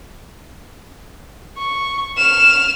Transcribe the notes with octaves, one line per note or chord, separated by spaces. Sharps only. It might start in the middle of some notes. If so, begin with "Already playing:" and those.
C#6
F6 E7